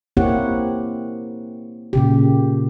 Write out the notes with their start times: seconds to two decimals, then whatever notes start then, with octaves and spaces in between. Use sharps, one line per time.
0.17 A#3 C4 E4 G4 C#5 F#5
1.93 A#2 C#3 G4